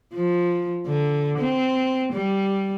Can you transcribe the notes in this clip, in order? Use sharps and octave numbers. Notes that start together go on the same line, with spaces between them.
F3
D3
C4
G3